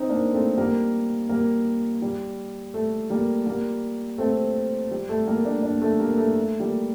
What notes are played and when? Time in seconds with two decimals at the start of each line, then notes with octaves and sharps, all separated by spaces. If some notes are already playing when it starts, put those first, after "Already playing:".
Already playing: C4 D#4
0.09 A#3 D4
0.33 A3 C4
0.58 G3 A#3
1.29 G3 A#3
2.02 G3
2.74 A3
3.10 G3 A#3
3.46 G3 A#3
4.18 A3 C4
4.91 G3
5.09 A3
5.27 G3 A#3
5.45 A#3 D4
5.63 A#3 D4
5.82 A3
5.99 G3 A#3
6.17 A3
6.35 A3
6.59 G3 A#3